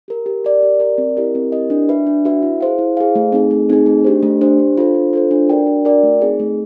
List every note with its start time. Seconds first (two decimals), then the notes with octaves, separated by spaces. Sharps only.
0.08 G4 A#4
0.26 G4
0.45 A#4 D5
0.63 G4
0.80 A#4 D5
0.98 C4
1.17 E4 G4 A#4 D#5
1.35 C4
1.52 E4 G4 A#4 D#5
1.70 D4
1.89 F#4 B4 E5
2.07 D4
2.25 F#4 B4 E5
2.43 E4
2.61 G#4 C5 F5
2.79 E4
2.97 G#4 C5 F5
3.15 A3
3.32 C4 D#4 G#4
3.51 A3
3.69 C4 D#4 G#4
3.86 A3
4.04 D4 G4 C5
4.23 A3
4.41 D4 G4 C5
4.59 D4
4.77 F4 A4 C5
4.94 D4
5.13 F4 A4 C5
5.31 D4
5.50 F#4 A#4 D5 G5
5.67 D4
5.85 F#4 A#4 D5 G5
6.03 A3
6.21 C4 D#4 G#4
6.40 A3